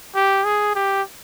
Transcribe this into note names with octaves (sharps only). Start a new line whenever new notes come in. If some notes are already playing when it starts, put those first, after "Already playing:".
G4
G#4
G4